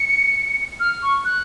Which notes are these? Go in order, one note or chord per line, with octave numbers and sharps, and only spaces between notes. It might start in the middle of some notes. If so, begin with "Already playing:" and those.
Already playing: C#7
F6
C#6
F#6